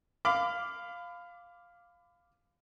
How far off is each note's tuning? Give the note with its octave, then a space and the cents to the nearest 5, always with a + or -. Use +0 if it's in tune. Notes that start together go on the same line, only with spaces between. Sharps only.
F5 +0 B5 +35 D6 +0